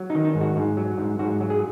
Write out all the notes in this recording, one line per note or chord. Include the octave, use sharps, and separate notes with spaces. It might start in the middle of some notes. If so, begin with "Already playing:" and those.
Already playing: F#3
D#4
D#3
D#4
G#2
F#4
G#2
F#3
G#2
G#2 F#4
F#3
G#4